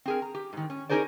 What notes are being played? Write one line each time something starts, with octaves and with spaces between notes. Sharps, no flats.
C4 G#4 A#4
A#5
G4
G#2 D#3
C#4
C#4 D#4 G#4 A#4 C5 D5